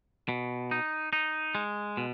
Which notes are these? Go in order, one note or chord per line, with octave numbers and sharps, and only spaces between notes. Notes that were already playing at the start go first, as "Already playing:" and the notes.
B2
D#4
D#4
G#3
B2